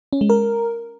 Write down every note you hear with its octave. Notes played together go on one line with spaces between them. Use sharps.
C#4
G#3
A#4